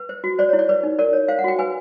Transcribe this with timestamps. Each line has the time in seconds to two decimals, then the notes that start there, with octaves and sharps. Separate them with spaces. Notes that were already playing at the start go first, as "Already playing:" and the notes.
Already playing: B4
0.09 C5
0.24 F#4
0.38 C5 D5
0.49 C#5
0.53 E4
0.59 D5
0.69 B4 D5
0.83 D#4
0.99 A#4 D5
1.13 C#5
1.28 C5 F5
1.39 F#5
1.44 F#4 G5
1.59 B4 G#5